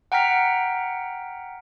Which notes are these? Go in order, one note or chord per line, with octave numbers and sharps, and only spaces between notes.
F#5 G5 A#5 F6 B6